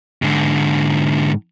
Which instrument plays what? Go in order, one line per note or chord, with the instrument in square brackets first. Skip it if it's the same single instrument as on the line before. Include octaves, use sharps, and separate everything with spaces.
[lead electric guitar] G#2 D3